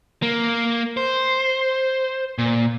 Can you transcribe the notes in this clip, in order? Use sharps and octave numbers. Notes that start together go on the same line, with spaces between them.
A#3
C5
A#2